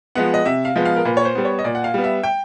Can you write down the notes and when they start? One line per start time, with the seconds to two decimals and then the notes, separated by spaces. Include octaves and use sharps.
0.15 F3 G#3 B3 F#5
0.34 D#5
0.46 C3 E5
0.65 F5
0.76 F3 G#3 B3
0.85 F5
0.96 A#4
1.05 A#2 B4
1.17 C#5
1.25 C5
1.35 G3 B3
1.45 C#5
1.59 D#5
1.64 A#2 D5
1.75 F#5
1.84 F5
1.94 G3 B3
2.04 E5
2.23 G5